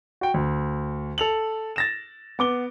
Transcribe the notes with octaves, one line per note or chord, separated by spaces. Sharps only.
F#4 G5
D2
A4 F7 F#7
A6 A#6 E7
B3 D6 G7